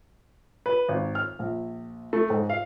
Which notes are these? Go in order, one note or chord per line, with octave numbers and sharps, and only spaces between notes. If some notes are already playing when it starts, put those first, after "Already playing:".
B4
G#1
F6
A#1
A3
G#2
F5